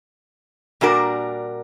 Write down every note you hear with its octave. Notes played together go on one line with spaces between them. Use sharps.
A#2 G3 D4 F#4 A#4